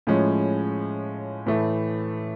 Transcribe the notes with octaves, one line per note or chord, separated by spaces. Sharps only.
A2 F3 G#3 C#4
A2 E3 A3